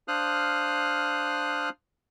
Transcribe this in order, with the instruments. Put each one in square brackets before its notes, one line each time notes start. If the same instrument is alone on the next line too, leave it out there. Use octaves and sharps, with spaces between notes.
[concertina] D4 C5 F5 D#6 F6 F#6